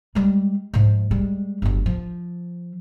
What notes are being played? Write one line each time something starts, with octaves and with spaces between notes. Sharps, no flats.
G3 G#3
G#2 F3
G3 G#3
G1 F#3
F3